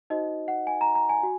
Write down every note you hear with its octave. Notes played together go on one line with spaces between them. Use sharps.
D#4 F#4 C5 D#5
F#5
G#5
A#5
A#5
G#5
F#4